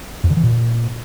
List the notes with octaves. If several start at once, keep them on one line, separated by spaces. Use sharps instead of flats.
F2
D3
E3
A#2